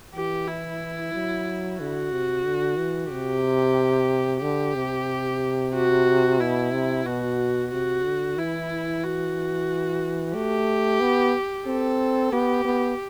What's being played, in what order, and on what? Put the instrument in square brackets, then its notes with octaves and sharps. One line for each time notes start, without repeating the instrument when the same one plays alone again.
[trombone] E3 [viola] G4
[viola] E4
[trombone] F#3
[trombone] D3 [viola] F#4
[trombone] C3
D3
E3
[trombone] C3 [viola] G4
[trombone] D3 [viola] G4
[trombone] C3
[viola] F#4
[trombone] B2 [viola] E4
[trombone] C3
[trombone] B2 [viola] F#4
[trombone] C3 [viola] F#4
[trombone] D3
[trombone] E3 [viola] E4
[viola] F#4
[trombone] A3 [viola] G4
[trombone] B3
[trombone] C4 [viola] A4
[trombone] B3 [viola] G4
[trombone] B3